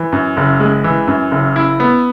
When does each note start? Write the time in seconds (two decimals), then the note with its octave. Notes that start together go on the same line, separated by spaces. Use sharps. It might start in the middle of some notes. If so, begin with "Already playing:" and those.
Already playing: E3
0.12 F#2
0.37 F#1
0.60 G#3
0.84 E3
1.08 F#2
1.31 F#1
1.56 E4
1.80 B3